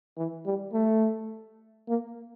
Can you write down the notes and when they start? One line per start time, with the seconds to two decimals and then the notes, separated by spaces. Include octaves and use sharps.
0.17 E3
0.46 G3
0.73 A3
1.88 A#3